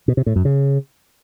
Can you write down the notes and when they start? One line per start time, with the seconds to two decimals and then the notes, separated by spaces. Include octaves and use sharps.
0.08 B2
0.17 C3
0.26 A2
0.36 F#2
0.45 C#3